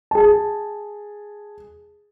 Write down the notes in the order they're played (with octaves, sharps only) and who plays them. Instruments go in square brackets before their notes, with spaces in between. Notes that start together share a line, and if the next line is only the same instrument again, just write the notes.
[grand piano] G#4 A5